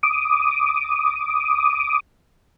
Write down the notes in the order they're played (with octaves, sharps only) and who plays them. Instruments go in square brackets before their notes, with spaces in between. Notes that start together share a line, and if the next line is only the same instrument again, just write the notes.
[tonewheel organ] D6 D#6